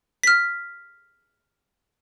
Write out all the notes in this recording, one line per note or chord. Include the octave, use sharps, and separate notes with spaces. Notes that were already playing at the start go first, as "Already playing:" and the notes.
F6 B6